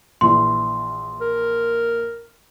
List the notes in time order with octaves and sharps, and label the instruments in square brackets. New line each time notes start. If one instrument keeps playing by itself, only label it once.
[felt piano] A#1 E3 [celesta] C6
[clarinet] A#4